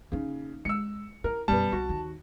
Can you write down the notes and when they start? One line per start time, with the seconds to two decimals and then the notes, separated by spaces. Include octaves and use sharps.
0.12 C#3 A#3 D#4
0.65 G#3 E6 C#7
1.24 E4 A#4
1.48 F#2 B2 G3 B3 A5
1.72 C2 F#4
1.89 D#2